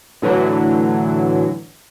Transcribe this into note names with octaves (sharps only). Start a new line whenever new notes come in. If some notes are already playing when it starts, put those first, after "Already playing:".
A2 D3 E3 F#3